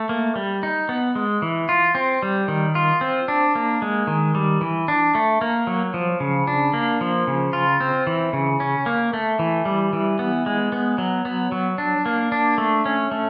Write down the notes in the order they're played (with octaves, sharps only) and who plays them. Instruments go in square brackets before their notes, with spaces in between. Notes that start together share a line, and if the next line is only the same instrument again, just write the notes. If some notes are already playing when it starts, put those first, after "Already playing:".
Already playing: [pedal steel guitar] A3
A#3
G3
D#4
B3
G#3
E3
F4
C4
G3
D#3
F4
C4
D4
A#3
G#3
D#3
G3
E3
D4
A3
A#3
F#3
F3
C#3
D4
A#3
F3
C#3
F4
C4
E3
C#3
C#4
A#3
A3
E3
G3
E3
B3
G#3
B3
F#3
B3
F#3
D4
A#3
D4
A3
C#4
A3